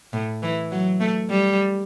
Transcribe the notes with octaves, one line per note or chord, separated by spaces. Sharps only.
A2
E3
F#3
A3
G3